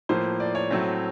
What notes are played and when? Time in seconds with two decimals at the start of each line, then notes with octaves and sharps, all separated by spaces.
0.09 A2 F3 A#3 C5
0.40 D5
0.55 C#5
0.71 A2 F#3 A3 C4